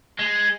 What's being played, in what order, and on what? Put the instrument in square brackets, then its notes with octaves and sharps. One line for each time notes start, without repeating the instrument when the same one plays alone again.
[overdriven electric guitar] G#3